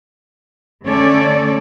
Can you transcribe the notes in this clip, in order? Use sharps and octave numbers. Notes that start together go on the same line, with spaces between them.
D3 A3 C#4 A4 D5